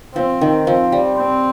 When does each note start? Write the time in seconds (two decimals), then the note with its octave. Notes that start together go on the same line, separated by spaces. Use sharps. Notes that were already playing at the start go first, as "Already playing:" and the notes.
0.15 F3 C4
0.41 D#3
0.67 F3 C4
0.92 G3
1.18 C4